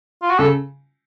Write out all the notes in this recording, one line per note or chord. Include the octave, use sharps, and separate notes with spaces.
F4
F#4
C#3 A4